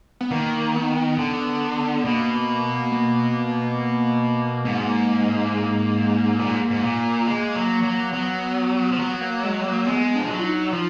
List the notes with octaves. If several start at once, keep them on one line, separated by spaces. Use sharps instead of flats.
B3
D#3 A#3
B3
D3
B2 A#3
A#3
G#2 A#3
B3
A#3
A#3
A#2
G#2
G#2
A#2
G#3
F#3
F#3
F#3 B3
F3
F#3 B3
B3
A#3
G#3
A#3
G#3 B3
F3 D4
F#3
F4
D#4
F3 F4